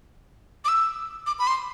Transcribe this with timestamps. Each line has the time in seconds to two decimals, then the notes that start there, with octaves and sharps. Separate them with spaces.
0.65 D6
0.68 E6
1.27 D6
1.39 B5
1.47 C6